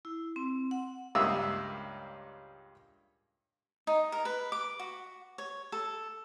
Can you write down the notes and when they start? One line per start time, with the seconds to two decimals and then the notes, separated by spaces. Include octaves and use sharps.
0.05 E4
0.36 C4
0.71 F#5
1.15 C#2 G2 A#3 E5 D#6 E6
3.87 D#4
4.12 A#4
4.25 B4
4.52 D6
4.80 F#4
5.38 C#5
5.72 A4